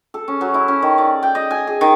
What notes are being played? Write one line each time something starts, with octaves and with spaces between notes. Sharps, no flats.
A4
C#4
F#3
E4
C#4
D#3
D5
G5
D#5
G#5
G#4
D#3